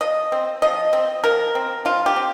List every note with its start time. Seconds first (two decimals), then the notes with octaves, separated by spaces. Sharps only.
0.01 F3 D#5
0.32 C4
0.62 F3 D#5
0.93 C4
1.24 F3 A#4
1.55 C4
1.85 F3 F4
2.06 G4
2.16 C4